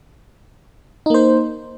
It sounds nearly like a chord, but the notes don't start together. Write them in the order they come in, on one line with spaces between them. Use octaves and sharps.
D#4 A#3 C5